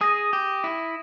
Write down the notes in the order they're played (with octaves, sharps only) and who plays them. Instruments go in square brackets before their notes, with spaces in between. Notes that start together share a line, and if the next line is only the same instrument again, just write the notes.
[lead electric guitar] G#4 [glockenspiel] D#6 A#6 D#7
[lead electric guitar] G4
E4